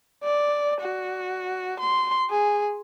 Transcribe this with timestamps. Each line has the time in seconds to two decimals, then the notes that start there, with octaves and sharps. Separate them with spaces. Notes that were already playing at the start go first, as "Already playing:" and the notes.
0.23 D5
0.80 F#4
1.79 C6
2.30 G#4